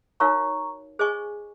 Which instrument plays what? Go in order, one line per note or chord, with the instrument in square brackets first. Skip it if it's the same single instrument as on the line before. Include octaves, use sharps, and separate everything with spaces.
[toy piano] D#4 F#4 A#4 C#5 F5 [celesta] A#5 C#6
[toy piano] G#4 C5 D#5 G#5 C#6